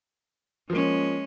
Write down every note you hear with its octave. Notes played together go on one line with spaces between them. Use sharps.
F3 G#3 A#3 C#4